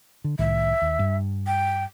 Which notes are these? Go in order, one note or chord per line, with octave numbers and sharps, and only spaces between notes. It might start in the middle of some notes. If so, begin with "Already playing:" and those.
D3
C2 A2 D#3 E5
D#2
G2
G5